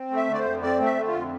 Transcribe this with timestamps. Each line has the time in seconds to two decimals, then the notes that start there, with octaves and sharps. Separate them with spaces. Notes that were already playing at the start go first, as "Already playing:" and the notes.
Already playing: C4
0.11 A3
0.16 E5
0.28 D3
0.33 D5
0.39 C5
0.45 F2
0.62 C4 D5
0.80 A3
0.85 E5
0.96 D3
1.07 F4
1.13 F2